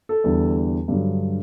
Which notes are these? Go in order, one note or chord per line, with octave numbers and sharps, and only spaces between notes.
A4
E2 D3 G3
G2 D3 F#3